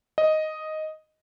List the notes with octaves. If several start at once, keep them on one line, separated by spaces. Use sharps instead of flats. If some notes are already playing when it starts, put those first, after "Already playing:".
D#5